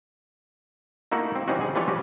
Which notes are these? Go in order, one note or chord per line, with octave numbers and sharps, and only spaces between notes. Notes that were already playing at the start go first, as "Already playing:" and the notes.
A3 A#3 D#4 E4 F#4
C4
E3 G3 C4 C#4 D#4 F#4
G#4
E3 F3 G3 F4 B4 C#5
C#4 F#4 G4